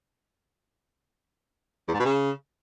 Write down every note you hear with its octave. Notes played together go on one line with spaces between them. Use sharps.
E2
G#2
B2
C#3